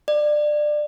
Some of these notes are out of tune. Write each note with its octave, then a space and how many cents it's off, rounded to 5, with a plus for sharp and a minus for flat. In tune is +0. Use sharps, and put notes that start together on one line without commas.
D5 +20